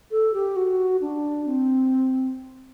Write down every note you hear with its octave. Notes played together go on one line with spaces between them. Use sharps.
A4
G4
F#4
D4
C4